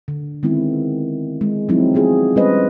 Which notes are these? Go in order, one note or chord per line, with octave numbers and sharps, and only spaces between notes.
D3
D#3 G#3 B3 C4 E4
G#3
F3 F#3 G#3 C4 D#4 E4
G#3 B3 F4 G#4
G3 G#3 C#4 B4 C5 D#5